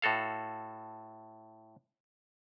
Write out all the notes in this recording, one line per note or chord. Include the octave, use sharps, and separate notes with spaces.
A2 F#4 A4 F5